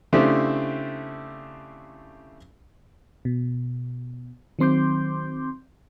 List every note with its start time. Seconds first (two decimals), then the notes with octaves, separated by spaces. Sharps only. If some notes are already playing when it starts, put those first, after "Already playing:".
0.13 C#3 A3 C4 D4 E4 G4
3.25 B2
4.59 D#3 F#3 C4 C6 D6 G6